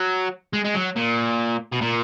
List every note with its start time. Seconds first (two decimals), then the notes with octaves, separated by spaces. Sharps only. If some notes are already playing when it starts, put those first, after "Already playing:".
Already playing: F#3
0.53 G#3
0.64 G#3
0.74 F#3
0.96 A#2
1.72 B2
1.81 A#2